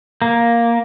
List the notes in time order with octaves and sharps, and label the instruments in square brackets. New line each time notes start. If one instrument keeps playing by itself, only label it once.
[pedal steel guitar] A#3